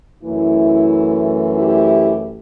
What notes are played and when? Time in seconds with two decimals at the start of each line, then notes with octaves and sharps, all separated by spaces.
0.23 F#2 E3 A3 E4
1.55 E4 G4